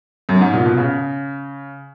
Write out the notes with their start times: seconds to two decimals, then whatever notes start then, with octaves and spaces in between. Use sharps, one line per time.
0.29 F#2
0.41 G#2
0.54 A#2
0.66 B2
0.77 C#3